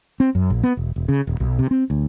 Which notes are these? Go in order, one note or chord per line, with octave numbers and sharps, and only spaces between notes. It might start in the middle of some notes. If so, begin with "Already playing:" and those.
C4
F#2
A#1
B3
E1
E1
C#3
D#1
B1
C3
C4
D2